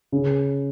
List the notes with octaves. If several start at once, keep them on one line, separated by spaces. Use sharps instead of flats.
C#3